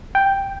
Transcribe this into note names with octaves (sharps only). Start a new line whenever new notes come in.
G5